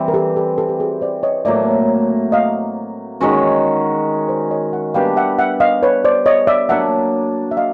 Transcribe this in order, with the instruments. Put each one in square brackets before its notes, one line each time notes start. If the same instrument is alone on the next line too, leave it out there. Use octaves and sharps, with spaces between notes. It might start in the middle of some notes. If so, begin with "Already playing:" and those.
Already playing: [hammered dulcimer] E3 G3 C4
[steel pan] A#4
G4 A4
G4 A4
G4 A4
G4
F#4 G#4
C5 D5
C#5 D#5
[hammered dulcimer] A2 F#3 A#3 [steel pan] D5 E5
[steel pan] D#5 F5
[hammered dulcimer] D#3 G#3 C#4 F#4
[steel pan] C5 D5
C#5 D#5
E5 F#5
[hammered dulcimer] G3 B3 D4 G4 [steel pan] F5 G5
[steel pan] E5 F#5
E5 F#5
D#5 F5
B4 C#5
C5 D5
C#5 D#5
D5 E5
[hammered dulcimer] F#3 A#3 D4 [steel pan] E5 F#5
[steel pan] E5
D#5 F5